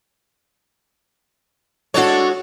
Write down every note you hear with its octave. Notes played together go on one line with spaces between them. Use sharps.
G#3 D4 F#4 A4 C#5